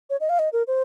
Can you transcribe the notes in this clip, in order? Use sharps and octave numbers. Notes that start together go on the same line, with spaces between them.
C#5
D#5
F5
D#5
A#4
C5